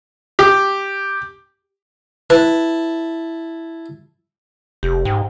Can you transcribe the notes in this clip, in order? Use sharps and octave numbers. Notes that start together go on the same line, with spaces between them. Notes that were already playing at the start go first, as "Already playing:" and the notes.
G4
E4 B4 A5
F1 G4
G#2 G5